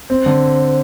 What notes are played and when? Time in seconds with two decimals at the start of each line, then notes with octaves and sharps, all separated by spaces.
0.10 C4 C5
0.26 D3